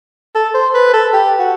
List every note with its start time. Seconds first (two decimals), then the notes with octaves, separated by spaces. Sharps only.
0.35 A4
0.54 C5
0.75 B4
0.93 A4
1.13 G4
1.39 F#4